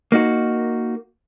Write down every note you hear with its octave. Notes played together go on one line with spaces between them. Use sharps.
A#3 D#4 F#4